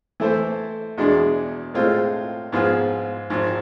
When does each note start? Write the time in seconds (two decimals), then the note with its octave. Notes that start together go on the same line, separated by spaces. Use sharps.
0.20 E3 A3 E4 A4 C5
0.98 E2 B2 G#3 D4 G#4
1.74 A2 G#3 C4 F4 A4
2.52 G#2 F3 B3 F4 G#4
3.30 G#1 G#2 F3